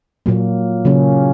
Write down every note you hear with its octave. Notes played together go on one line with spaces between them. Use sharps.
A#2 F#3 A#3
C#3 F#3 A#3 C#4